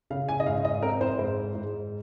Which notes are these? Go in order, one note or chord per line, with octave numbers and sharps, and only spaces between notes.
C#3 F5
G#5
D#5
G#2 F5
D#5
C4 A#4
C5
G#2 C5
G#2